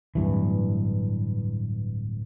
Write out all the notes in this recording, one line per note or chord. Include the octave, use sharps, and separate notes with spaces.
D1 G2 E3